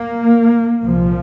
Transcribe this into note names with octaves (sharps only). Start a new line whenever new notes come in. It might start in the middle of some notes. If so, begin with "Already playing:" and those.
Already playing: A#3
C2 A#2 F3